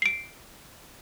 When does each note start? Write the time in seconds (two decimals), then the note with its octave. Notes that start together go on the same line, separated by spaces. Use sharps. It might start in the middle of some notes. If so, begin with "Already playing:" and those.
0.02 C7 D7